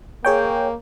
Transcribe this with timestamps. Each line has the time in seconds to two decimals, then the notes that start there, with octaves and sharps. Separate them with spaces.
0.25 A#3 G#4 C#5 G5